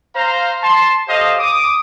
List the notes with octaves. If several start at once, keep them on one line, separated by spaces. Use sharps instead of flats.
C5 F5 A#5
A5 C6
G4 A4 C5 C#5 D#5 F5
D6 D#6